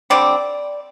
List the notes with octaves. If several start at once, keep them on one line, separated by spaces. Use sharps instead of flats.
D3 G3 C4 D5